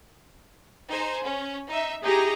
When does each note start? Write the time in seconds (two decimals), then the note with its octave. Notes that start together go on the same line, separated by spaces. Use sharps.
0.88 D#4 G#4 C5
1.22 C#4
1.68 D#4 E5
2.03 D#4 E4 G4 G#4 D#5 A#5